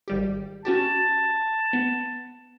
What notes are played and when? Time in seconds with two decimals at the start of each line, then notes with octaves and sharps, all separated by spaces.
0.08 G#1 G3 G4
0.65 C#4 F#4 G4 A5
1.73 B3